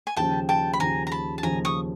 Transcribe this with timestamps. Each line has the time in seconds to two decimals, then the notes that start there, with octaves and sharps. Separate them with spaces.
0.07 G#5
0.16 D#2 C#3 F3 G5 A5
0.49 G5 A5
0.73 B5
0.80 D#2 C#3 F3 G#5 A#5
1.07 A#5
1.12 A5 B5
1.38 A5
1.43 D#2 C#3 F3 G#5 A#5
1.65 C#6 D#6